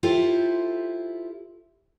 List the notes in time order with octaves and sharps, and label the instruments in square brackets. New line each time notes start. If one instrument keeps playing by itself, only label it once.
[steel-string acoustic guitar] E4 F4 G4 A4 C5